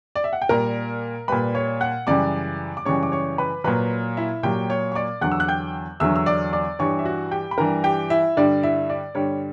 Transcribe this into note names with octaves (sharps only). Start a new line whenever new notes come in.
D5
E5
F#5
G5
A#2 G3 A#4 A#5
A#2 G3 B4 B5
C#5 C#6
F#5 F#6
F#2 C#3 E3 G3 D5 D6
D6
F#2 C#3 E3 G3 C#5 C#6
D6
C#5 C#6
B4 B5
A#2 F#3 B4 B5
E4 E5
A#2 F#3 G4 G5
C#5 C#6
C#6
D5 D6
E2 D3 F#3 F#5 F#6
E6
F#6
G5 G6
E2 D3 F#3 E5 E6
E6
D5 D6
D5 D6
G2 E3 G3 C#5 C#6
E5
F#4 F#5
G4 G5
B5
G2 E3 G3 A#4 A#5
G4 G5
E4 E5
G2 D3 G3 D5
E4 E5
D5
G2 D3 G3 C#5